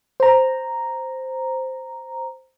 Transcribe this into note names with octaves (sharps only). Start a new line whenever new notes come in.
C5 A#5